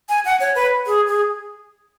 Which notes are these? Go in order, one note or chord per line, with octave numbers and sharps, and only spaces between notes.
G#5
F#5
C#5
B4
G#4
G#4